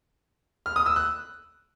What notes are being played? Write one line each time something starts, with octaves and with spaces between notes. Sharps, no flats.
F6
D#6
E6
F#6